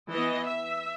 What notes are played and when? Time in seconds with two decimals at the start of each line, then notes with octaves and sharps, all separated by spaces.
0.11 E3 B3 D#5
0.47 E5